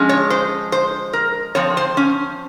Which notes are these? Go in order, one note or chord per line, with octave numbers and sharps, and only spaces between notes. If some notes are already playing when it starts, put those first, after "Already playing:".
Already playing: F3 G#3 C#4
C#5
C5
C5
A#4
F3 C4 C#5
C5
C#4